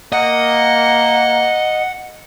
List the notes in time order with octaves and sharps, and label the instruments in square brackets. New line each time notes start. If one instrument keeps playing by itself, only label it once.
[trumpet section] A#3 [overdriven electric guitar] D#5 [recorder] F#5